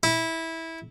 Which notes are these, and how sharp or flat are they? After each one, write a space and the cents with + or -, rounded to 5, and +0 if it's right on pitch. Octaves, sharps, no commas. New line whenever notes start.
E4 -15